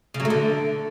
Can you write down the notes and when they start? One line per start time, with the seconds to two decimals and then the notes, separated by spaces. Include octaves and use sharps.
0.14 C#3
0.20 F#3
0.25 A3
0.30 D3